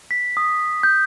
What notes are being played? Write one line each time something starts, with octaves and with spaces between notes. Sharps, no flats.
B6
D#6
G6